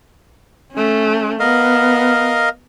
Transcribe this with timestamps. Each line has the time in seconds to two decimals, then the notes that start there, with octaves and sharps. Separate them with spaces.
0.72 A3 C#4
1.40 B3 A#4 D#5 F5